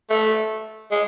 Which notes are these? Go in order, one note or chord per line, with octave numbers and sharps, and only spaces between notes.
A3
G#3